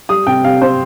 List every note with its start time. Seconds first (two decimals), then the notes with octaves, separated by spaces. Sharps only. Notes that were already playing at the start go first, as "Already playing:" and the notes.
0.09 G3 D#6
0.27 C3 G5
0.44 C3 F5
0.62 C4 C5